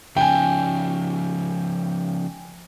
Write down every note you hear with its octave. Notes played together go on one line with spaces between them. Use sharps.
C#3 F3 G5 G#5